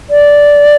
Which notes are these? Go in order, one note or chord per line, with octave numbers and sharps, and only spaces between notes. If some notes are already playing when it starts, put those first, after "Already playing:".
D5